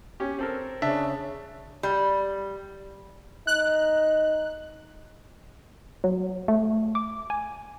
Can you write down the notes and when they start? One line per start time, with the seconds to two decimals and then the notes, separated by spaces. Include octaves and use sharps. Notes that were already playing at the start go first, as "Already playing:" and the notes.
0.20 C#4 G4
0.39 C4 A4 A#4
0.82 C#3 D4 E5 A5
1.83 G3
3.47 D#4 F#6
6.04 F#3
6.48 A3
6.95 D6
7.30 G#5